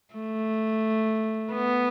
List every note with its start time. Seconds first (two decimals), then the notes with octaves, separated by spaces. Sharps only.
0.15 A3
1.53 B3